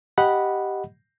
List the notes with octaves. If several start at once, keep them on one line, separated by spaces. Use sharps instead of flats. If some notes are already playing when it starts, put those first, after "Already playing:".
G4 D#5 F#5 B5